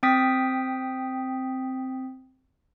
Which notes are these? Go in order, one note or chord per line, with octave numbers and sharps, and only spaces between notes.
C4 G5 D#6 B6